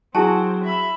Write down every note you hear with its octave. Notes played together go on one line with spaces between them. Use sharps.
F#3 C4 E4 F#4 G#4 A5
E5 B5